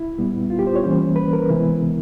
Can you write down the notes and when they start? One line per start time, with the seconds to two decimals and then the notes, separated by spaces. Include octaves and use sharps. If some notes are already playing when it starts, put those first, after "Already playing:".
Already playing: E4
0.18 A#2 G3 B3
0.50 F4
0.59 G4
0.67 C5
0.76 C#5
0.83 E3 G3 A#3 C#4 C5
1.16 B4
1.33 A#4
1.50 C3 E3 G#3 B3 E4